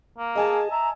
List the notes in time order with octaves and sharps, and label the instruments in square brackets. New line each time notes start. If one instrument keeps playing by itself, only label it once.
[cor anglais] A#3
[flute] G#4 [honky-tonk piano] D#5 G#5 A5
[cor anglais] E5 [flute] A#5